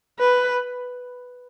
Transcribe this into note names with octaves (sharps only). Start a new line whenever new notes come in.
B4